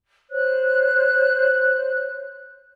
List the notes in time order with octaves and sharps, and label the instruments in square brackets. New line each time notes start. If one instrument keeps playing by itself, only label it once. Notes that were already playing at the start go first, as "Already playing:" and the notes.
[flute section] C5 C#5 F#6